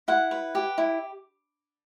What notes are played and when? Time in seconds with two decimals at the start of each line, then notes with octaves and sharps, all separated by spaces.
0.08 E4 F#5
0.31 B4
0.55 G4
0.78 E4